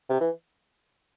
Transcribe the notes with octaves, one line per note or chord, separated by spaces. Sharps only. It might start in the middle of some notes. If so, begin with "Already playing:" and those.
C3
E3